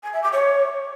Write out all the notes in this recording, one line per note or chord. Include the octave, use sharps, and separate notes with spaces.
G#5
E5
D6
C#5